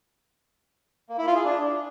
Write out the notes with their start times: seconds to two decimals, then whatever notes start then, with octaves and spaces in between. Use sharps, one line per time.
1.09 A#3
1.18 E4
1.27 F4
1.36 G#4
1.44 D4